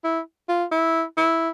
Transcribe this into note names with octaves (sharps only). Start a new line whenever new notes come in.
E4
F4
E4
E4